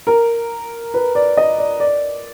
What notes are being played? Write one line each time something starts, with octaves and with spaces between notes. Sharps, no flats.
A#4
B4
D5
D#5
D5
D5